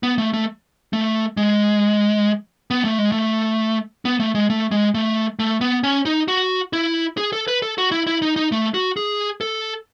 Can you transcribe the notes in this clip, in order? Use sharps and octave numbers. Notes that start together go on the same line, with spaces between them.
B3
A3
A3
A3
G#3
B3
A3
G#3
A3
B3
A3
G#3
A3
G#3
A3
A3
B3
C#4
D#4
F#4
E4
G#4
A4
B4
A4
F#4
E4
E4
D#4
D#4
A3
F#4
G#4
A4